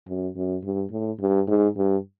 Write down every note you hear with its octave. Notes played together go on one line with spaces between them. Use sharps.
F#2
F#2
G2
A2
G2
G#2
G2